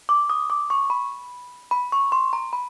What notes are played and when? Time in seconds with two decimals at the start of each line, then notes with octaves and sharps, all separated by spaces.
0.09 D6
0.30 D#6
0.50 D6
0.70 C#6
0.90 B5
1.71 B5
1.92 C#6
2.12 C6
2.33 A#5
2.53 B5